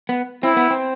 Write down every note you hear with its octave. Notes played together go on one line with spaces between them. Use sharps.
B3
C4 E4
B3
C4